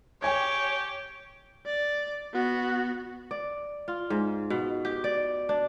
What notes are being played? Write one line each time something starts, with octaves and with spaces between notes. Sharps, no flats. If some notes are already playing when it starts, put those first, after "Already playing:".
G4 C#5 G5 G#5 G#6
D5
B3 F#4
D5
F4
G#2
B2
G4
D5
D4